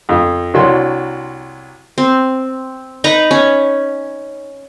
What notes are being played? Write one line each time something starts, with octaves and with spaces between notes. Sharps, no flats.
F2
C2 F#3 D4 C6
C4
D#4 B4 A#5
C#4